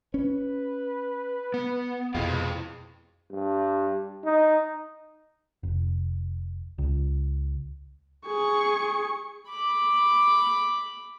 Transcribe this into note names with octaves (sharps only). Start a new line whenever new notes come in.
C#4 B4
B3
F2 B2 E4 G#4 F5
G2
D#4
F1
C#2
G#4 C#6
B5 D6